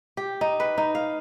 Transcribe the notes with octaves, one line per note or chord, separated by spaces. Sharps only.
G4
D#4
B4
D#4
F5